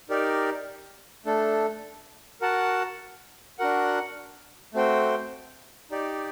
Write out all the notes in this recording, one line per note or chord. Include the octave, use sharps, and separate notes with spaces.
D#4 G4 A#4 D5
A3 D4 A4
F#4 A#4 F#5 A5
D4 F#4 A#4 F#5
A3 C4 F#4 C5 G5
D#4 G4 D5